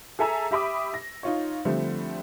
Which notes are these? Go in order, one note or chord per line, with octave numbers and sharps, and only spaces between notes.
G#4 A4 E5 G#5 A#5 E6
G4 E5 B5 D6 D#6
A#6
D#4 F4 C#5
D3 F3 G3 A3 C4